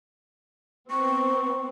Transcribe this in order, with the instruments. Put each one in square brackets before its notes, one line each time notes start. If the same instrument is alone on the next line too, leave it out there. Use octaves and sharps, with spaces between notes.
[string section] B3 C4 [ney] C#6